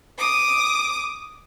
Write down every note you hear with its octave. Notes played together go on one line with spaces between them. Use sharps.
D6 D#6